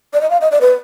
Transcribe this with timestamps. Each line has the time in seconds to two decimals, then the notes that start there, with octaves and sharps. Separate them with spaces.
0.14 D5
0.21 D#5
0.30 F5
0.41 D#5
0.51 D5
0.61 B4